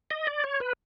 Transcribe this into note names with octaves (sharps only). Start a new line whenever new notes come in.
D#5
D5
C#5
B4